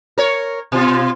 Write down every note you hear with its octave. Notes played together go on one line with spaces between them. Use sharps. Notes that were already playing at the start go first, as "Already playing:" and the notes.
A#4 C#5
B2 F4